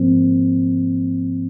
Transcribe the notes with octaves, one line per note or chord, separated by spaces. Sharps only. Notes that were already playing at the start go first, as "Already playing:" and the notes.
Already playing: G#2 F3 A#3 C4